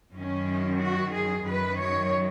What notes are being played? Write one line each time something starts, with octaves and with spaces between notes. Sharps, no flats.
F#2 D#3 C#4
F#4
G#4
F#2 D#3 B4
C#5